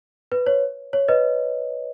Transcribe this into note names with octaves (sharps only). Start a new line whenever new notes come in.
B4
C#5
C#5
B4 D#5